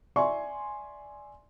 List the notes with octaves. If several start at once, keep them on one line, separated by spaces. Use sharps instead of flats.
D5 E5 G#5 C6 C#6